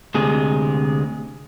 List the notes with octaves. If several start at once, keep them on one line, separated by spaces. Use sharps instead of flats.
D2 C3 G#3 G#4